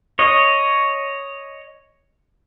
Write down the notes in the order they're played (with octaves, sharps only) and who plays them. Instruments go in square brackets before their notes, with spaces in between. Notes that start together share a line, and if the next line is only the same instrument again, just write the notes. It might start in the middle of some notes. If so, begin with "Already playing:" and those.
[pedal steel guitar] C#5 D#5